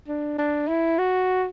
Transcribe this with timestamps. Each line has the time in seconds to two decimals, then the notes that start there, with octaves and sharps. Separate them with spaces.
0.08 D4
0.39 D4
0.68 E4
0.99 F#4